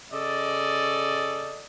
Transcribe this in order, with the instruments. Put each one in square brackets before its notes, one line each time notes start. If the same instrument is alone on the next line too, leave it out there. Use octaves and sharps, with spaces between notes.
[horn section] C#3 A4 D5 D#5